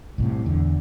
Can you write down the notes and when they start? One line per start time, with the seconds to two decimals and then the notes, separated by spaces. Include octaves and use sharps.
0.18 C2 A2 C3
0.46 E2 D3